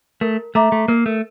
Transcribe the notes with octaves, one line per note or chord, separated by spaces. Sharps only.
A3 A#4
A3 E5 A#5 D6
A3
A#3 A#4
A3